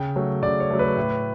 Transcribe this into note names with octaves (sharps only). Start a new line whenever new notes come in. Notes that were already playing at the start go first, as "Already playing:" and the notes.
Already playing: C#3 G5
F#3 A3
C#3 D5
C#5
F#3 A3
B4
A2